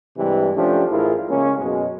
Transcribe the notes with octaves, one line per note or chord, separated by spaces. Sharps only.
G2 C3 E3 G3 G#3
F3 A3 C#4 D4 G4
A1 E4 F4 G#4 A#4
C#3 G#3 A#3 C#4
F#2 B2 G#3